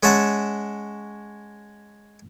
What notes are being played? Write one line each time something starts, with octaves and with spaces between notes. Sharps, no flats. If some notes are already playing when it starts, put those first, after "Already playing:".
G#3 C#4 E5 F#5 A5